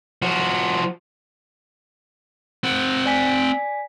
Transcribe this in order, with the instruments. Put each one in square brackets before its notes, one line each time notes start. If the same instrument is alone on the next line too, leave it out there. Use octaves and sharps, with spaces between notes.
[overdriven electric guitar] F3 F#4
[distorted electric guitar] C4 F#5
[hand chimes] D5 G#5 B6